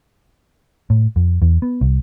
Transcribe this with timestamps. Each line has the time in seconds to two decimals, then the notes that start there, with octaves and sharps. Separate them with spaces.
0.90 A2
1.16 F2
1.42 E2
1.62 B3
1.81 C2